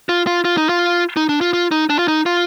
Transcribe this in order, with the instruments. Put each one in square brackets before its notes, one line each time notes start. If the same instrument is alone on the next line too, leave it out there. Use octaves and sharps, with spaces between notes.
[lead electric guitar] F4
F4
F4
D#4
F4
D#4
D4
F4
F4
D#4
D4
F4
D#4
F4